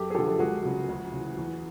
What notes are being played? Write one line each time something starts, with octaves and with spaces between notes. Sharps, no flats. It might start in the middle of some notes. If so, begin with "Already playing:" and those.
Already playing: F#2 G4 A4
G#4
D3 F3 G4 A4
A4
C#2 F#4 G#4
C#3 F#3
D2
C#3 E3
E2